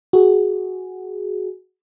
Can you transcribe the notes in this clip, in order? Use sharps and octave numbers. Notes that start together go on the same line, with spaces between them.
F#4 G#4